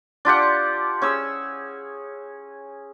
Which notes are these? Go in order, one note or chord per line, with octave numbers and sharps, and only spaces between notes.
D4 F4 G4 F#5
C#4 G#4 E6